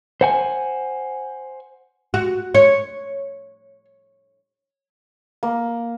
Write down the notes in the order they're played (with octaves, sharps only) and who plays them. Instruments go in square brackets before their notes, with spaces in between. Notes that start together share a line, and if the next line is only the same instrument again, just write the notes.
[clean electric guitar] C5 F#5 G#5
[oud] F#4
C#5
[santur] A#3